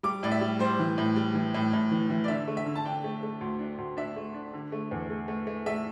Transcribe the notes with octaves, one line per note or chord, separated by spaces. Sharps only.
G3 D6
A2 D5
E5
G3
G3 C5
E3
A2
G3
E3
A2
A2
E3
E3
D5
D3 E5
A3
E5
D3
A5
D4 G5
A3
A3
D2
D4
D2
D4 E5
A3
D4
D3
A3
E2
A3
A3
A3
A3 E5